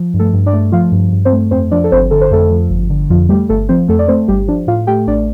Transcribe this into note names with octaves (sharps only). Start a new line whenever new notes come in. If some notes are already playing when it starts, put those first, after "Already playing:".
Already playing: F3
G2
A3 A4
G2
D4 D5
A3
F3 F4 F5
G2
G2
C4 C5
A3
F2 C4 C5
F3 D4 D5
A4
G1 C4 C5
D3 A4
C5
F2 A3 A4
F3
G1
D3
F2 F3 F4
G3 A3 G4
G1 A3 A4
F3 C4 C5
F2 A3 A4
D5
A3 C4 C5
G1 G3 G4
F3 D4
A2 F4 F5
A3 G4 G5
A1 D4 D5